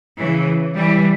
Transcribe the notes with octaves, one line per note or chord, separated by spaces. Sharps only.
C#3 E3
E3 G3